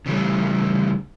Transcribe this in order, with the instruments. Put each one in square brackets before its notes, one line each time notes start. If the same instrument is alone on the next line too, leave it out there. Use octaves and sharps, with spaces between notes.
[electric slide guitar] C#3 E3 G3 A3